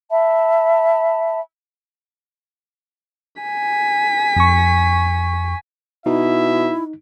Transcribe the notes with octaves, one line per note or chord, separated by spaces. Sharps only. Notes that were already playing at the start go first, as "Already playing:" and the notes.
E5 A5 B5
G#5 B6
F2 C#6
B2 D#4 E4 E5